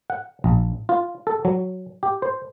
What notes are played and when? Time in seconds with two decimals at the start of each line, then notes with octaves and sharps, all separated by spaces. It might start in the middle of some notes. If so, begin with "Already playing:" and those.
0.10 F#5
0.44 A#1
0.89 F4
1.27 A4
1.45 F#3
2.03 G4
2.22 C5